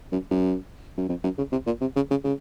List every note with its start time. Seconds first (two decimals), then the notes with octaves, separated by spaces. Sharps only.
0.12 F#2
0.31 F#2
0.98 F#2
1.09 F2
1.24 F#2
1.38 C#3
1.52 C3
1.66 A#2
1.81 C3
1.96 C#3
2.11 C#3
2.24 C#3